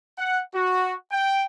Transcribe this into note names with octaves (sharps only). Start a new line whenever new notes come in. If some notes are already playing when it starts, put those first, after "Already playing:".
F#5
F#4
G5